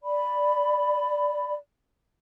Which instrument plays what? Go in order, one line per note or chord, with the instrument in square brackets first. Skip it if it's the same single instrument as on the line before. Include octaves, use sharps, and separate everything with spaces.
[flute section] D5 B5